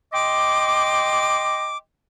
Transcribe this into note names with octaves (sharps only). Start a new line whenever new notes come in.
D#5 G5 C6 D6